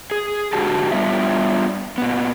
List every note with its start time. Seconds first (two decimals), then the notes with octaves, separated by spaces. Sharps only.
0.11 G#4
0.53 G#2 D3 F#4 G4 A5
0.92 G3 B3 D4 F4 E5
1.98 A#2 B3